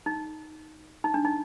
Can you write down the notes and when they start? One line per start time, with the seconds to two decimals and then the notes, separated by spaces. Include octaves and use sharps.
0.06 D#4
1.04 D#4
1.14 D4
1.25 D#4